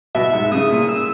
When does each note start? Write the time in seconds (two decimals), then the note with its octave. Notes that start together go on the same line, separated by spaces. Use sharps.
0.15 B2 E5
0.33 G#2
0.52 C#3 D#6
0.70 A#2
0.89 E6